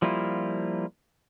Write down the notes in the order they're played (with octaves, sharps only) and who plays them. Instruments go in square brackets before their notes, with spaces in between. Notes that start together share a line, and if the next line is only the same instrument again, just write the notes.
[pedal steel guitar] F3 G3 A#3 E4 F4